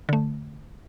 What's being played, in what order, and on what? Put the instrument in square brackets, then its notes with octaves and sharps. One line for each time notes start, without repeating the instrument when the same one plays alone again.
[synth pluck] D3 A3